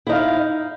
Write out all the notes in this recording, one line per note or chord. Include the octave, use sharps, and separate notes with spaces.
D#4 E4 F5